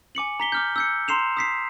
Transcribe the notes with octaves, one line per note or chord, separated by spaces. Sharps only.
G#5 D6 C#7 F#7
A#5 B6 G7
D6 F6 G6
E6 G6 C#7
A#5 C6 C7 E7 F7
D#6 B6 C7